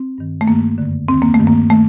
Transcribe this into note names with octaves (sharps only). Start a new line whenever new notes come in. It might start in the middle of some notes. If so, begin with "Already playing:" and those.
Already playing: C4
G2 D#3
A3
G2 D#3 A#3
F#2 D3
D#2 D#3 C4
A#3
A3
G2 D#3
A#3
D#3 A3